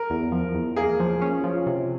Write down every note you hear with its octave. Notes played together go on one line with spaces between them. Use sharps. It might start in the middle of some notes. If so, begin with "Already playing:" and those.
Already playing: A#4
E2
F3
E2
A#3 G#4
F3
C#4
F3
C3